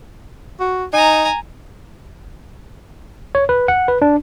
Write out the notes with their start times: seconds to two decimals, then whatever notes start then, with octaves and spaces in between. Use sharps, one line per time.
0.60 F#4
0.93 D#4 G#5 A#5
3.35 C#5
3.49 B4
3.68 F#5
3.88 B4
4.02 D4